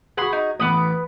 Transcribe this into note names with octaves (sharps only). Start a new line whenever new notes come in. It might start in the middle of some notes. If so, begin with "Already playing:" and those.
F#4 G#4 F#5 B5 C6
D#4
A1 B3 B5 D6 D#6